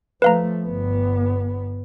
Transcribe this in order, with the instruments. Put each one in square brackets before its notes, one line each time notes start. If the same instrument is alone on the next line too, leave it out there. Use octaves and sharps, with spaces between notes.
[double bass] F3 A3 [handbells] B4 F5 A#5
[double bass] G1 B3